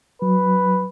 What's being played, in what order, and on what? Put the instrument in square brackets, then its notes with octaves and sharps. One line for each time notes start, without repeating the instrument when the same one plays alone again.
[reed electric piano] F#3 [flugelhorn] B4